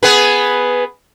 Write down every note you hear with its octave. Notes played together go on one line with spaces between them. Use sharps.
B3 G#4 B4